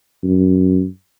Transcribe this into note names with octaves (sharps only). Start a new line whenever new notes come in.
F#2